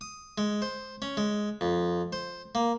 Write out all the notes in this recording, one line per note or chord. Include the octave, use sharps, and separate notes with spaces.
D#6
G#3
C5
C#4
G#3
F2
C5
A#3